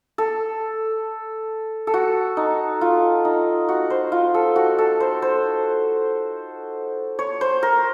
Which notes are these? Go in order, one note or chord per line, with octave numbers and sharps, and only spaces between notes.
A4
A4
F#4
D#4
F4
D#4
F#4
C5
F4
A4
F#4
A4
C5
C5
C#5
C5
A#4